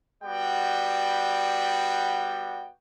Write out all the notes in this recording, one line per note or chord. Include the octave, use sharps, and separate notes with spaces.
G3 B3 F#4 D5 G5